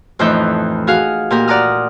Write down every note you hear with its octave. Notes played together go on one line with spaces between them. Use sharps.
F2 A2 E3 D#4 E5 G6
F#4 G#4 F5
A#2 G4 A#4
D5 F#5 A#5 D#6 F6